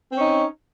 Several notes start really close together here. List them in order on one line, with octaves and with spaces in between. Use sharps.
C4 C#4 D#4